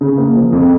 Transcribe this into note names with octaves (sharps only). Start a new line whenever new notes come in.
C#3
A#3
F3
F2